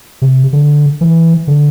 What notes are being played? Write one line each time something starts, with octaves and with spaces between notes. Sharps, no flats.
C3
D3
E3
D3